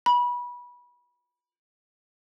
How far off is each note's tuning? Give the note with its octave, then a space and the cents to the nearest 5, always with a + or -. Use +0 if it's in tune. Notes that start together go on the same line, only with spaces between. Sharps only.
B5 -20